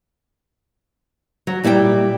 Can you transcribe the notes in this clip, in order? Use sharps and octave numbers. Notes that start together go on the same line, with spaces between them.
F#3
A#2 G3 E4 C#5 G5